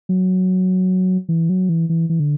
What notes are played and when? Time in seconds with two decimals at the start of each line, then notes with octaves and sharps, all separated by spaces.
0.09 F#3
1.29 E3
1.49 F#3
1.69 E3
1.89 E3
2.09 E3
2.20 D3